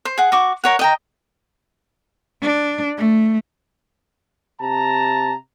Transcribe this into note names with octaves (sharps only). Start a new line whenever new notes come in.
C5
G#4 F#5
F#4 C#6 D6
A#4 C#5 F#5
D#5 G5 A#5
D4
A3
C3 A5 A#5